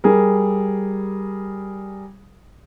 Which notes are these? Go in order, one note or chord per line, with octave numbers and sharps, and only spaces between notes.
G3 G#4 A#4